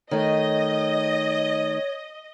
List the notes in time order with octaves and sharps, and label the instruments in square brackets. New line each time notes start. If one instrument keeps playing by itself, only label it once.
[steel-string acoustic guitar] D#3 A3 [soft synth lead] C#5 [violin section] D#5